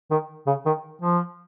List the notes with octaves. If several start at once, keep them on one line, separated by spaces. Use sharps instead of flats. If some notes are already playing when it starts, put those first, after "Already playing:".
D#3
C#3
D#3
F3